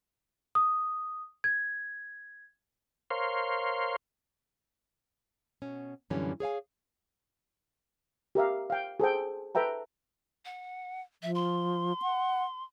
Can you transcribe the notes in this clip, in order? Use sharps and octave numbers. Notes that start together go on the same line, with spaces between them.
D#6
G#6
A#4 C5 C#5 F5 C6
B2 C#4
F#2 A#2 D3 E3 G3 C#4
G#4 C#5 F5 G#5
G4 A#4 E5 F5
F5 G5
G#4 A4 C5 G5
A4 B4 E5 G5 A#5
F#5
F3 E5
C6
F#5